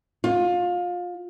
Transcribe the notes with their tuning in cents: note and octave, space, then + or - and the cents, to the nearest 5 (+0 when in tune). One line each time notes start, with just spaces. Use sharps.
F4 +25